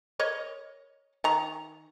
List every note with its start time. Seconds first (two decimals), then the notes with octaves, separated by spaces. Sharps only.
0.19 A#4 C#5 D#5
1.24 D#3 A#5